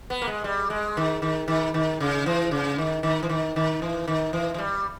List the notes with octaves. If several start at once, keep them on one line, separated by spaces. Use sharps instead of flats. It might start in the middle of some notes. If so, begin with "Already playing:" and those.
B3
A#3
G#3
G3
G#3
D#3
D#3
D#3
D#3
C#3
E3
C#3
D#3
D#3
E3
D#3
D#3
E3
D#3
E3
E3
G3